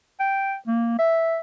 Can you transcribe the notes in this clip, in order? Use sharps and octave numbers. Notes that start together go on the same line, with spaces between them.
G5
A#3
E5